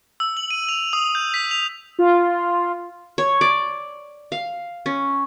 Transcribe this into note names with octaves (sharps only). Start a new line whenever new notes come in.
E6
F#7
D#7
F7
D#6
G6
B6
F7
F4
C#5
D5
F5
C#4